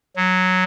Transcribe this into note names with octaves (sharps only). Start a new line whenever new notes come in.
F#3